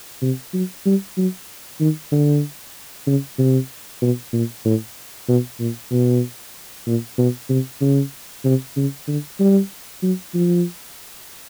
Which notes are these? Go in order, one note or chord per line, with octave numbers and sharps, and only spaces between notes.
C3
F#3
G3
F#3
D#3
D3
C#3
C3
B2
A#2
A2
B2
A#2
B2
A#2
B2
C3
C#3
C3
C#3
D3
G3
F#3
F3